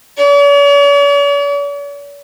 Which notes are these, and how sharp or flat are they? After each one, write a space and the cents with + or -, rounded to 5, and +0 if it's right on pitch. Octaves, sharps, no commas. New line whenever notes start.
C#5 +45